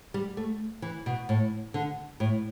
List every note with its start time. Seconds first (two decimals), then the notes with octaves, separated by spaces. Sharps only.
0.14 G3
0.37 A3
0.82 E3
1.06 B2
1.29 A2
1.74 D3
2.20 A2